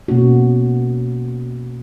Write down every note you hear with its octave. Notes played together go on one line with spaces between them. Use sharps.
B2 A#3 C#4 F#4